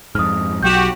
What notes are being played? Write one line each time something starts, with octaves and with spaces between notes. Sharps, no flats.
F2 G#2 D#6 F6
B1 F#3 F#4 G4 G6 E7